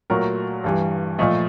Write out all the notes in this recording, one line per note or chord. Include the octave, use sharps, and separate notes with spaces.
A#2 F#3 A3 A#4
G2 E3 G3
A#2 F3 A3 D#5